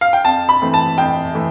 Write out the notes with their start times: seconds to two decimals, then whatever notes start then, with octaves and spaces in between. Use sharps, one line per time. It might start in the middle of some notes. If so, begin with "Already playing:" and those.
0.01 F5
0.13 G5
0.25 F2 A5
0.49 B5
0.62 E3 A3 C4
0.74 A5
0.98 F2 G5
1.35 E3 A3